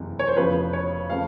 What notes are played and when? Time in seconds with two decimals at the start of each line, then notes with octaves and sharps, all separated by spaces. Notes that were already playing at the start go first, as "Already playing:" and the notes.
Already playing: F#1 E2 C3 E3
0.19 C#5
0.28 C5
0.37 F1 E2 C#3 F3 B4
0.73 C#5
1.10 C#3 F3 A3 C4 F5